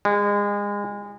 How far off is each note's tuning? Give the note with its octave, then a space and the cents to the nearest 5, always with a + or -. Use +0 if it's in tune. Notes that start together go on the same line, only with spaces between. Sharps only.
G#3 -30